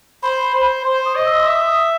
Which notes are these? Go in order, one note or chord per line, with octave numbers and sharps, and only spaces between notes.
C5 B5
C5
C5 C6
D#6
D#5
E6
C6
E5 D#6
D#6